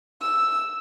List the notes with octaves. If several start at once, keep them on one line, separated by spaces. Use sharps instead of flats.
E6